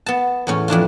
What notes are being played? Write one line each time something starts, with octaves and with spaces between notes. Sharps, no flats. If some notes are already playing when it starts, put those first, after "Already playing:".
B3 A5
E2 A2 C#4
F2 E3 D4 F4